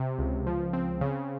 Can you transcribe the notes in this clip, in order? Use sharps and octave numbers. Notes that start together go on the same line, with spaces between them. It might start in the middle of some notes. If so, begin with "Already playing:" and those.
Already playing: C3
C#2
F3
C4
C#3